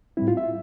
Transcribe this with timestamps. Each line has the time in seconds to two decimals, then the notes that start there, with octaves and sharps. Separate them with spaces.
0.17 A2 G3 C4 E4
0.28 F4
0.37 E5